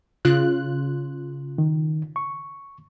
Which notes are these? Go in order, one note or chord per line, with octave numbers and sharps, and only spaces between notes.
C#3 F4 F#6
D#3
C#6